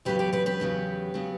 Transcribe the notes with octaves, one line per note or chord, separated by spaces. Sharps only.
E2 C#3 F#3 B3 G4 B4
G4 B4
G4 B4
G4 B4
E2 C#3 F#3 B3
C#3 F#3 B3